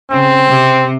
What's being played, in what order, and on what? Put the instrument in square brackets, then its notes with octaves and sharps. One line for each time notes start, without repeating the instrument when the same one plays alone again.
[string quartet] C#3 [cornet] C4
[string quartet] C3